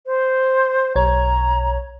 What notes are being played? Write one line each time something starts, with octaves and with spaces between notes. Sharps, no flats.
C5
B1 C#5 A#5 G#6